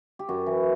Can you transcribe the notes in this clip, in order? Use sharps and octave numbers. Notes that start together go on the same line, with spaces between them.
G4
F#2 F#4
E3